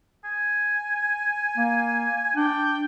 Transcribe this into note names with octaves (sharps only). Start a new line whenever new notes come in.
G#5
A#3
D4 G5